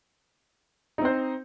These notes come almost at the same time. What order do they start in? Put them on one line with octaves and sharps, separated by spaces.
D#4 C4 C5